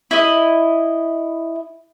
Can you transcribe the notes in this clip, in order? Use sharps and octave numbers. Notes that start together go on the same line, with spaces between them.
E4 D#5